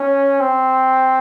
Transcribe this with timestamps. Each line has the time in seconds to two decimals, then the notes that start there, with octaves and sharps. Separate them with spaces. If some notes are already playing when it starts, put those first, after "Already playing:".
Already playing: C#4
0.40 C4